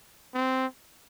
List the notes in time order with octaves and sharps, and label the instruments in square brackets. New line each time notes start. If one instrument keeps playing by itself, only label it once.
[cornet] C4